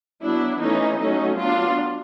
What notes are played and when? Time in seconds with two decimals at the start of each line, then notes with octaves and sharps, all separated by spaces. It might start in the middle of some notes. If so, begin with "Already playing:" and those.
0.23 F#3 B3 D4 E4
0.61 E3 A3 C#4 D#4
1.00 F#3 A3 C#4 D#4
1.38 F#3 B3 D4 F4